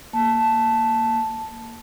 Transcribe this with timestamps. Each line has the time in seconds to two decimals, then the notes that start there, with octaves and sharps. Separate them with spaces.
0.13 A#3 A5